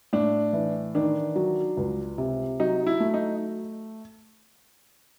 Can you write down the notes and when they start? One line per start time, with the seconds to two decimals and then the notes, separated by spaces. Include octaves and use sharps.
0.13 A2 D4
0.53 E3
0.95 D#3 D4
1.36 F#3
1.77 C#2
2.18 C3
2.60 F#3 D#4
2.87 E4
3.00 A3
3.14 D#4